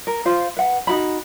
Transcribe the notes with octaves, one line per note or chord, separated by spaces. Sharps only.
A#4
F4 C5
B4 F#5
D#4 F#4 B5